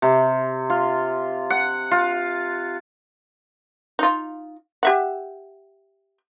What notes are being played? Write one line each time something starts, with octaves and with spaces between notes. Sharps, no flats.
C3
F4
F#5
F4
D#4 F4
G4 E5 F#5